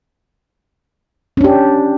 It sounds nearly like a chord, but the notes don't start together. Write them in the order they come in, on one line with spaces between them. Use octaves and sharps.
C#4 D4 G4